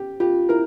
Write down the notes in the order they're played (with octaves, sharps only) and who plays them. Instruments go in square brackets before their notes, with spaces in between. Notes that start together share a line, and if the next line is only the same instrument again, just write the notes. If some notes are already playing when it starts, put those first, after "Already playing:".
Already playing: [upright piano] G4
[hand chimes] F4 [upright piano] G4
[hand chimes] E4 [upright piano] A#4